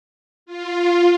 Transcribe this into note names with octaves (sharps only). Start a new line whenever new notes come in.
F4